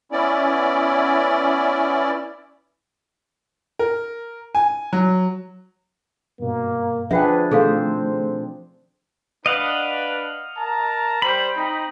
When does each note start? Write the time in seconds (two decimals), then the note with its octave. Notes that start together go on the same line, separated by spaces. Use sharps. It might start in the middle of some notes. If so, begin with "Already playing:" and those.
0.12 B3 C#4 E4 D5
3.79 A#4
4.55 G#5
4.93 F#3
6.40 G2 B2 A#3
7.11 F3 D4 G#4 B4 E5 F#5 G5
7.51 B2 D#3 A3 C4 G#4 A4 C5 F5
9.46 D4 B4 D#5 F5 F#5
10.57 A#4 A5 A#5
11.22 G3 C5 B5
11.56 C4 D#4